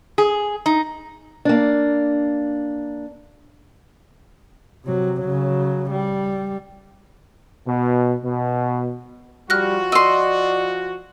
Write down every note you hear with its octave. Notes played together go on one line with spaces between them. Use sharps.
G#4
D#4
A#3 D4
C3 F#3
C#3 F#3
G3
B2
B2
F3 G3 F4 F#4 F6 F#6 A#6
D5 D#5 C6 E6